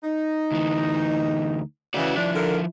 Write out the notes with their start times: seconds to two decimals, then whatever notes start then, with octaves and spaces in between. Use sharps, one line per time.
0.03 D#4
0.52 D2 E3
1.94 C#3 E3 F#4 D5
2.16 F3 D4 E4
2.34 D3 A#4